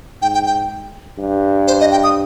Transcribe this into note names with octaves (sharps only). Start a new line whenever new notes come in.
G#2 G5
G5
G5
G2
C5
D#5
G5
D#6